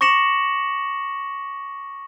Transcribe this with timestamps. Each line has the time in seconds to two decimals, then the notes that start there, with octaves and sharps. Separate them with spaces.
0.01 C#6 D6 A#6 C#7 E7 F#7